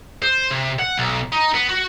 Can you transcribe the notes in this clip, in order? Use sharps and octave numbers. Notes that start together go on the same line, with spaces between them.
C5
C3
F#5
B1
D#4
B3
F#4